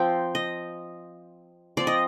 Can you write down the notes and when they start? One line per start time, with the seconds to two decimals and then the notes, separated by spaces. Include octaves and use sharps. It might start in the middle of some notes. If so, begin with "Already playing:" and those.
Already playing: F3 C4 G5
0.35 D#5
1.77 F3 C4 D5
1.87 D#5